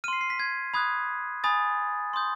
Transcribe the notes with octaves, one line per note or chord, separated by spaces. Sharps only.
C6 F6 C7 D#7
C7
B6
G#6
B5 D#6 F#6 G#6
G#5 B5 D#6 A6
C6 D#6 G6